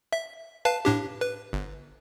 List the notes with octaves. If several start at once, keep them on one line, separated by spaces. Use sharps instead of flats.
E5
B4 F5 A5
A2 D4 G4
B4
G1